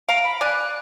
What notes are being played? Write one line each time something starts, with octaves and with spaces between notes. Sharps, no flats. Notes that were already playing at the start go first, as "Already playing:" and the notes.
F5 A#5 D7
B5
D5 G#5 F#6